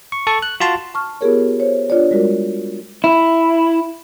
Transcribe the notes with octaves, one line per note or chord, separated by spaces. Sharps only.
C#6
A4 A5 C#6
F#6
F4 F#4 A5 C6
A5 C#6 F6
B3 F4 G4 G#4 A#4 C#5
C5 C#5
D4 F4 C#5 D5
G3 G#3 F#4 A#4
E4